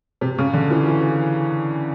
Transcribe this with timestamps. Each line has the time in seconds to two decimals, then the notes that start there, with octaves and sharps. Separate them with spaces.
0.21 C3
0.38 C#3
0.54 D3
0.71 E3
0.87 E3